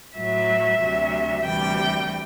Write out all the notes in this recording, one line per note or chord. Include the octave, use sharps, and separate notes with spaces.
A2 F#3 E5
D2 C3 F#3
D2 C3 E3 G3 G5